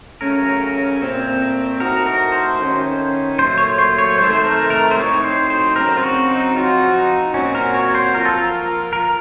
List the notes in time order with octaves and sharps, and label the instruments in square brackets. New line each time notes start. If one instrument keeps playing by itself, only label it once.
[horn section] C#3 F#3 A3 C#4 [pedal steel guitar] A#4
[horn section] A#2 A3 C4
[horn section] A2 A3 D#4 F#4 [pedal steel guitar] A#4
[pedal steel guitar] A#4
C5
[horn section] D#3 A3 C#4
[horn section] A#2 F#3 A3 [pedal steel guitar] C5
[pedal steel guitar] C#5
C5
C#5
[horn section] C3 D#3 A3 [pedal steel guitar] C5
[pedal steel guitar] C5
A#4
A#4
C5
[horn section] A2 F#3 A3 C4 D#4 [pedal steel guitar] C#5
[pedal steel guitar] C5
C5
[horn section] C#3 F#3 C4 [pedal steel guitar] A#4
[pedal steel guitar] F4
F#4
D#4
[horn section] F3 C4 F#4 [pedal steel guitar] F4
[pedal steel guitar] D#4
[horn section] A#2 F#3 C4 F#4 [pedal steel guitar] C#4
[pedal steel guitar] A#4
C#5
C5
[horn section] F3 A#3 F4 [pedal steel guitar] A#4
[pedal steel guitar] A4
A#4
A#4